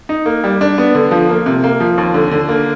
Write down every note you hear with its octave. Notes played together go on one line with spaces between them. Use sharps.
D#4
A#3
G3
D4
B3
D3
F3
A#3
C3
A#3
F3
D#2
D3
D3
A#3